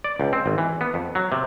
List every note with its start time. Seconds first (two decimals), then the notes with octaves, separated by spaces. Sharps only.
0.04 D5
0.20 C#2
0.33 C4
0.46 G#1
0.58 E3
0.81 B3
0.94 F2
1.15 F#3
1.32 C3